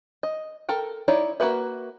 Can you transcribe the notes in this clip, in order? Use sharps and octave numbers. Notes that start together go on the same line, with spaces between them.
D#5
A4 A#4 G5
D#4 E4 C#5 D5
A#3 E4 F#4 B4 E5